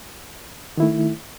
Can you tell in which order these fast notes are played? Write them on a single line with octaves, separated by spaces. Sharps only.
D#3 E4 A3